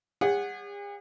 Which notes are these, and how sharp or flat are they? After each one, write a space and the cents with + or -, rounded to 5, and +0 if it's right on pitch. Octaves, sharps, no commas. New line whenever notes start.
G#4 -45 C#5 +25 F#5 -10